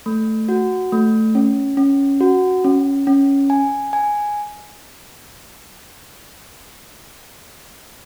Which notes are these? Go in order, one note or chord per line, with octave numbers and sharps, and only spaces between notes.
A3
F#4
A3
C#4
C#4
F#4
C#4
C#4
G#5
G#5